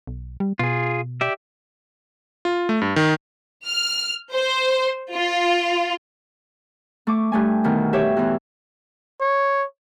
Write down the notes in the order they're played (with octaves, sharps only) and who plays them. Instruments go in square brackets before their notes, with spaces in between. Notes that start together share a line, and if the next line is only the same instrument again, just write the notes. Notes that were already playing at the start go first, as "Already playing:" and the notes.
[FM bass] B1
G3
[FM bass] B2 [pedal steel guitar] F4 G#4
[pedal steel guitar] G4 D5 E5
[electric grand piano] F4
A3
G2
D#3
[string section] F6
C5
F4
[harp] A3 C#6 D6
G2 A3 G#5
D2 B2 D#3
G4 C#5 E5
E2 E3
[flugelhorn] C#5